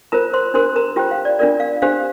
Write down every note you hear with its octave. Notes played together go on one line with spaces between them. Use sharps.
F4 A#4 C5 A#5
C5 C6
D4 G4 A#4 C5 C6
A#4 A#5
F4 G4 C5 G5
F5
D5
D4 F4 A#4 D5
F5
D4 G4 C5 F5